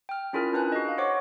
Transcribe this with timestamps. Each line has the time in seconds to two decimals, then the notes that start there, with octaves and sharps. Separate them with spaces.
0.09 G5 F6
0.33 C#4 E4 F4 G#4 A#4 F6
0.53 D4 B4 G#5 F#6
0.72 F#4 D#5
0.85 G#4 F5
0.98 C5 C#5 F#5 C#6 D6 A#6